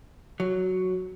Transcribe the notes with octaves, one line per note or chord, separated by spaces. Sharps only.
F#3